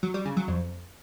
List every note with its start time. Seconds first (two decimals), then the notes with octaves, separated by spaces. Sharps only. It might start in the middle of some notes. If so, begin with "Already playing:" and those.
0.03 F#3
0.14 G3
0.25 C#3
0.37 F#3
0.48 F2